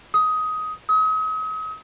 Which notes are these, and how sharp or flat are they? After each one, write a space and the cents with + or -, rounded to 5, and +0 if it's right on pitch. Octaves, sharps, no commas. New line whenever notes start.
D#6 +15
D#6 +40